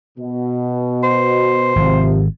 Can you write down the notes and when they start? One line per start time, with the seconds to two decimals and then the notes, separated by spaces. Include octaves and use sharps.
0.18 B2
1.03 C5
1.76 G#1 C3 F3